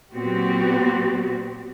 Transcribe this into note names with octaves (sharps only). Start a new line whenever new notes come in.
A#2 F#3 B3 C4 F#4 G4